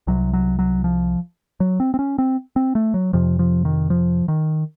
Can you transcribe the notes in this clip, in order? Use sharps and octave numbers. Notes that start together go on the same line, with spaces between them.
C2 C3 F#3
F#3
F#3
F3
F#3
C4
C4
C#4
C4
C4
A3
F#3
F2 C3 F3
F3
D#3
F3
D#3